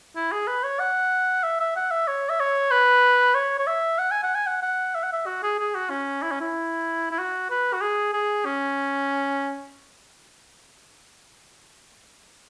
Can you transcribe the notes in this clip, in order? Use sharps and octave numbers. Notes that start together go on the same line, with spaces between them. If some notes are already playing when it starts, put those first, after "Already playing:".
E4
G#4
B4
C#5
F#5
E5
E5
F#5
E5
C#5
E5
C#5
B4
C#5
C#5
E5
F#5
G#5
F#5
G#5
F#5
F#5
E5
F#5
E5
F#4
G#4
G#4
F#4
C#4
E4
C#4
E4
E4
F#4
B4
F#4
G#4
G#4
C#4